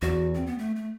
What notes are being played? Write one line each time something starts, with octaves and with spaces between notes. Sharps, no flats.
E2 F#4
C4
B3
A3
A3